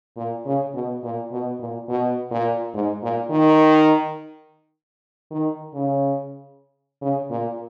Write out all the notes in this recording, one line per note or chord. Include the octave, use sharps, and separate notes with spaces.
A#2
C#3
B2
A#2
B2
A#2
B2
A#2
G#2
A#2
D#3
D#3
C#3
C#3
A#2